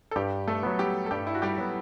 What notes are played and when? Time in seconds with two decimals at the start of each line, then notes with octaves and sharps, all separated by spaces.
0.11 A4
0.16 G2 G3 G4
0.48 A3 A4
0.63 F#3 B3
0.79 G3 G4
1.06 A4
1.11 G2 G3 G4
1.27 E4
1.35 F#4
1.42 G3 G4
1.58 F#3 B3